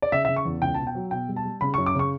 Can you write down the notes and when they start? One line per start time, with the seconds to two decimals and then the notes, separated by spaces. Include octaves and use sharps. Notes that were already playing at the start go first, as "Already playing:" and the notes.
0.02 D5
0.12 C#3 E5
0.25 E5
0.29 C#3
0.36 C#6
0.45 E2
0.62 C#2 G5
0.74 B2 A5
0.87 G5
0.95 F#3
1.11 B2 G5
1.28 G3
1.36 A5
1.45 G3
1.61 C#3 B5
1.74 C#6
1.78 F#2
1.86 D6
1.95 C#3 C#6